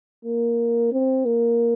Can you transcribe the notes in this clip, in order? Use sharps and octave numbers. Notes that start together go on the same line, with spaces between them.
A#3
C4
A#3